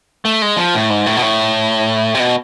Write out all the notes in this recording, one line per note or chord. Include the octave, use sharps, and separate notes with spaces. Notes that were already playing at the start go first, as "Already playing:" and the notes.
A3
G#3
F3
A2
G#2
A2
B2
A2
C3
B2